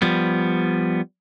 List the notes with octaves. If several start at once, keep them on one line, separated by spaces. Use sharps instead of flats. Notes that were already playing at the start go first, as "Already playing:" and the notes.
F3 G3 B3